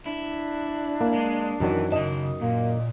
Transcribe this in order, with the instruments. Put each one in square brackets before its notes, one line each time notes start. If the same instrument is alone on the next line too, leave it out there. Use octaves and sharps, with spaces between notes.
[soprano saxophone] D4 [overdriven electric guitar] E4
[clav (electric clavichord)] A#3
[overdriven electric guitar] G#3
[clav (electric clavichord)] F#2 D#3 F#3 [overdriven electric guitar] E3
[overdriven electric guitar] C#3 A5 [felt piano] D#5
[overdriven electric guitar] A#2 [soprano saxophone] A#3